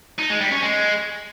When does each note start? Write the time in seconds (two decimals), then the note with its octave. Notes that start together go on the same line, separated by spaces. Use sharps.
0.19 D#4
0.30 G#3
0.41 G3
0.51 C#4
0.62 G#3